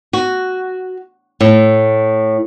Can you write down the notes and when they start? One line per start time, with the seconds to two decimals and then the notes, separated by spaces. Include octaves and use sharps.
0.13 F#4
1.41 A2